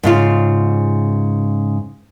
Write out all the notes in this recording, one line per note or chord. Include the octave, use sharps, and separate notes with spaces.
G#2 C#3 F4